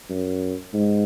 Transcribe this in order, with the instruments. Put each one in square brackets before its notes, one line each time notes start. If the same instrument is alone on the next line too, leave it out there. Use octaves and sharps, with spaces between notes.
[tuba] F#2
G#2